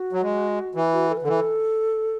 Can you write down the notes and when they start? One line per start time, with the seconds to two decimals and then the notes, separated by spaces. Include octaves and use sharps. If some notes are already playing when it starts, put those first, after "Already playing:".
Already playing: F#4
0.13 F#3
0.22 G#3
0.75 E3
0.93 F#4
1.10 A4
1.17 B4
1.22 D3
1.25 E3 A4